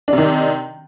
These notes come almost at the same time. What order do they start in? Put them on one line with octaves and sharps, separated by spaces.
D4 C3 D#3